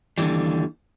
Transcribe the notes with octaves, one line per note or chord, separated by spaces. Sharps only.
D#2 D3 E3 G3